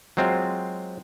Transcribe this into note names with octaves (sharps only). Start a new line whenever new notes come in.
F#3 G#3 C4 F4